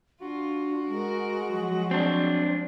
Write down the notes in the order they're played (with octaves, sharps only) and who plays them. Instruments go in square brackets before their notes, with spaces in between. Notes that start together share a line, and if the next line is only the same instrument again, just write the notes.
[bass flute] D4 [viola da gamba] F4 [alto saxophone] F#4
[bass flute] G#3 [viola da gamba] A#4
[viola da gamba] F3 F#3
[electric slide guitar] C4 D4